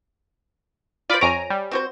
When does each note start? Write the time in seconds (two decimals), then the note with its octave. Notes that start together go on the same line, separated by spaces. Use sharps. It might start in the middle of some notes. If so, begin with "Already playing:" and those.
1.10 F4 C5 D5 B5 D6
1.21 F2 C#5 G#5 A#5 D7
1.50 G3
1.71 C4 F#4 C5